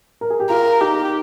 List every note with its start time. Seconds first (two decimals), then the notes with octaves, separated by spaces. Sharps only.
0.21 A#4
0.30 G#4
0.40 G4
0.50 F4 A#4
0.81 D#4 G4